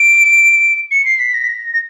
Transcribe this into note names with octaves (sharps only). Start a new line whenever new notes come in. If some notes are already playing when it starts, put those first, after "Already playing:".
Already playing: D7
C#7
C7
B6
A#6
B6
A#6
A#6